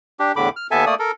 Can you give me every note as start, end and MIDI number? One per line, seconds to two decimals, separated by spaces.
0.20 0.32 62
0.20 0.32 67
0.36 0.49 40
0.36 0.49 45
0.36 0.49 50
0.36 0.49 83
0.36 0.49 86
0.56 0.67 89
0.71 0.85 39
0.71 0.85 59
0.71 0.85 69
0.71 0.85 76
0.71 0.85 80
0.71 0.85 81
0.86 0.95 57
0.86 0.95 58
0.86 0.95 74
0.86 0.95 87
0.99 1.11 69
0.99 1.11 70